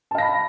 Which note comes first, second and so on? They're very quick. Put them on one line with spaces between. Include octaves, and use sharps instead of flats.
A5 F5 A#6 B5